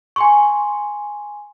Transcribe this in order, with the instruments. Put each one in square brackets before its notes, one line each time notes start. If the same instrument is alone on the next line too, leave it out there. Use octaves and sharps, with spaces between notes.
[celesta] G#5 C6 C#6